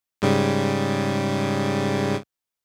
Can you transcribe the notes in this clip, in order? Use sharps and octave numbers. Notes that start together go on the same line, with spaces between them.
G#2 C#3 G3